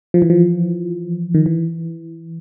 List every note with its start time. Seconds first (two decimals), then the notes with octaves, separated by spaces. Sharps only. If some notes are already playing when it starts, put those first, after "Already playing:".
0.14 F3
0.22 E3
0.30 F3
1.34 D#3
1.46 E3